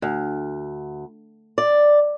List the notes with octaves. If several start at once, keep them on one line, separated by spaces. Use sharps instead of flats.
D2
D5